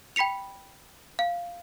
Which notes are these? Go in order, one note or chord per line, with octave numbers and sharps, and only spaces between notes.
G5 B5 B6 C#7 F7
F5